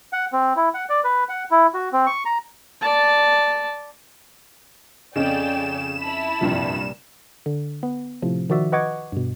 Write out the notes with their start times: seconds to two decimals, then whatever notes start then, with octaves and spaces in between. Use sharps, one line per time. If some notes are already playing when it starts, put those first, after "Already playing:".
0.13 F#5
0.33 C4
0.56 E4
0.74 F#5
0.90 D5
1.04 B4
1.29 F#5
1.51 E4
1.74 F#4
1.93 C4
2.06 C#6
2.25 A#5
2.81 D5 A5
5.16 F2 C#3 C#4 D5 D#5 G5 G#5 E7
6.01 E4 A5 B5
6.41 F#1 C2 G2 A#2 F3 G3
7.46 D3
7.83 B3
8.22 A2 C3 F3
8.50 D#3 F3 F#4 D5 E5
8.72 B4 D#5 F#5 C#6 D6 G#6
9.12 G2 B2